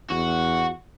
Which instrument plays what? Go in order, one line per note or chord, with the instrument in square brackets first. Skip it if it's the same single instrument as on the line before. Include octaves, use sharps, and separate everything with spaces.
[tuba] E2 [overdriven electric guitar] F#4